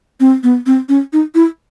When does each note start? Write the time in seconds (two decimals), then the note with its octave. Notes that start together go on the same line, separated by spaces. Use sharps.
0.20 C4
0.43 B3
0.66 C4
0.89 C#4
1.13 D#4
1.35 E4